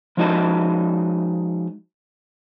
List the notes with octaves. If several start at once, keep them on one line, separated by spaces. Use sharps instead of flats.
F3 G#3 D#4 F#4 D#5 A5